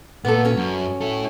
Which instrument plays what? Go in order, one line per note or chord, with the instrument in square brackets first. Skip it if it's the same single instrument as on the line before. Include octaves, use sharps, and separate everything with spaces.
[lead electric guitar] A#2 [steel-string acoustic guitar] B3 A4
[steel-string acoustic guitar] C#4 F#4
[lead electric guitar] F#2
E4 A4